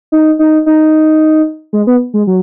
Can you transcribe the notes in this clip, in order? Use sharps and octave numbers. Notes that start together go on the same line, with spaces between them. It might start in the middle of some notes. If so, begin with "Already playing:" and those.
D#4
D#4
D#4
G#3
B3
G#3
F#3